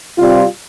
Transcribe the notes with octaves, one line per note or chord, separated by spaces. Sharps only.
C3 G3 C4 F4